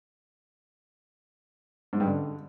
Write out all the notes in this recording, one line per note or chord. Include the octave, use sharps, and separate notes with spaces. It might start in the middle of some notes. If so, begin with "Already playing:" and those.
G#2
G2
D3